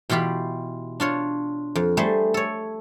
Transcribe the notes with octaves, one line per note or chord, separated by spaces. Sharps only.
B2 E3 F4 G4 B5
D4 F4 C#5
F2
G3 A3 G#4 C5
A4 C#5